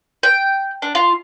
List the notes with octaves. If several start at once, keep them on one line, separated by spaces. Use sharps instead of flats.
G5
D4
F4